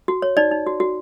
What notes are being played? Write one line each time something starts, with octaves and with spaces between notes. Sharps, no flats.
F#4
C#5
D#4 D5
D#4
F#4
F#4